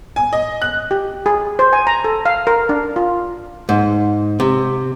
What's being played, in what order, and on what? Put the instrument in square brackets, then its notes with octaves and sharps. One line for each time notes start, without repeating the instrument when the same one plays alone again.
[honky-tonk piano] G#5
D#5
F#6
[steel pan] G4
G#4
C5
G#5
A#5
A4
F5
A#4
D4
F4
[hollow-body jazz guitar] G#2
C3